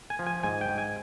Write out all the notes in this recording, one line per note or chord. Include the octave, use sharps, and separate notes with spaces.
G#5
F3
G#5
G#2 G#5
G5
G#2
G#5